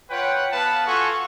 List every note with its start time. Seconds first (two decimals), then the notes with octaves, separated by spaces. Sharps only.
0.10 F4 B4 C#5 F#5 G5
0.52 B3 B4 F5 F#5 A5
0.87 F4 F#4 A4 F#5 G#5 C#6